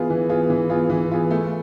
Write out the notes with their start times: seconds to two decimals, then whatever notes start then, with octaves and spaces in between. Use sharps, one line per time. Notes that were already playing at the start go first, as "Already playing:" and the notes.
Already playing: E3 B3 F4 G#4
0.10 E3
0.29 B3 F4 G#4
0.50 E3
0.69 B3 F4 G#4
0.90 E3
1.10 B3 F4 G#4
1.31 A3